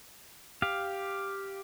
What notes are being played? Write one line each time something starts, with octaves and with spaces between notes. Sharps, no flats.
G4 F5